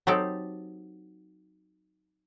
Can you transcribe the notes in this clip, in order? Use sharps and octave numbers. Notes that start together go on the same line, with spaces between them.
F#3 C4 D#4 G4 A4 D5